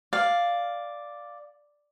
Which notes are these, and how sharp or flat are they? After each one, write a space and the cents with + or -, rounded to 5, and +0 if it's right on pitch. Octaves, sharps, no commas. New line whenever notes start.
D5 +0 F5 +0